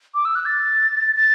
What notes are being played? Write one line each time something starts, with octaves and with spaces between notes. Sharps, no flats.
D6
E6
F#6
A6
A6